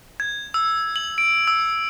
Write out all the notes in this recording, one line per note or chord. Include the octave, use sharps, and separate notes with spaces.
G#6
E6
F#7
D7
E6